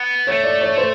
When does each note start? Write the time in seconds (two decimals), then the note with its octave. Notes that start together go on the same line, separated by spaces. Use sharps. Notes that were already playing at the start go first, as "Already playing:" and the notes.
Already playing: B3
0.27 A3 C#5
0.44 D5
0.61 C#5
0.78 C5